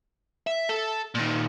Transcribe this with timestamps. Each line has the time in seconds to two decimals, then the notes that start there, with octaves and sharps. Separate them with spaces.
0.47 E5
0.69 A4
1.15 A#2 D#3